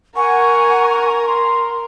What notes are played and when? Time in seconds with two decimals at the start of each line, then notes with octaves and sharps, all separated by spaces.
0.16 A#4 F#5 G#5 C#6
1.28 C6